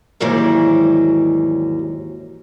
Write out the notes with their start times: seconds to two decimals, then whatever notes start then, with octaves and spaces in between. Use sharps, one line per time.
0.20 D#2 G#2 E3 F#3 G3